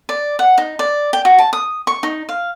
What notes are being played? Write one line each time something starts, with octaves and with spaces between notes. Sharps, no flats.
D5
F#5
D#4
D5
G5
F#4
A5
D#6
C#6
D#4
F5